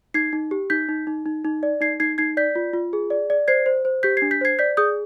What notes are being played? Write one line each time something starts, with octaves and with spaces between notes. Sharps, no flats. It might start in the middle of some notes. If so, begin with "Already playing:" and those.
D#4 G#6 C7
D#4
G4
D#4 G6 B6
D#4
D#4
D#4
D#4
D5
D#4 G#6 C7
D#4 G#6 C7
D#4 G#6 C7
D5 G6 B6
F4
F4
G#4
D5
D5
C5 G#6 C7
C5
C5
G4 G6 B6
G#6 C7
D4
G6 B6
C5 G#6 C7
D5 G6 B6
G#4 D#6 G6